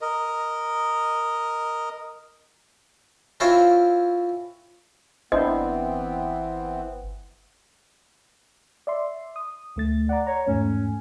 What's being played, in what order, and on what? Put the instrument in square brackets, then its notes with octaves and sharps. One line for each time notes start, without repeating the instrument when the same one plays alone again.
[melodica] A#4 D#5
[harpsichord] C4 C#4 E4 F4 C5 C#5
[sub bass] G1 [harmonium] E3 B3 C4 [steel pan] D4 E4 C5 [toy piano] D#5
[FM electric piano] D5 E5 C6
D#6
D2 A3 A6
[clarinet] D5 [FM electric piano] F#5 A#5
[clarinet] C#5 [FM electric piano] A#5
[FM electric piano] E2 G#2 A3 [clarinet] C#4